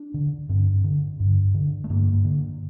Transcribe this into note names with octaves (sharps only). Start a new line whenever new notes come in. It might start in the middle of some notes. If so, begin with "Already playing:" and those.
Already playing: D4
D3
G2 C4
D3
G2
D3
A3
G2 A#3
D3